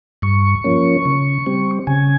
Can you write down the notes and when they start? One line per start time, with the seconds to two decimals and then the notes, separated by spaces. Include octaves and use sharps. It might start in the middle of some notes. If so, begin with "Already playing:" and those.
0.22 G2 C#6
0.64 F3 A#3 C#4
1.05 C#3
1.46 G3 C4
1.87 C#3 G#5